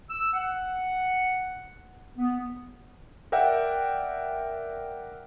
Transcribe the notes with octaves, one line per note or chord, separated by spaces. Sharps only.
E6
F#5
B3
A#4 D5 E5 F#5 G5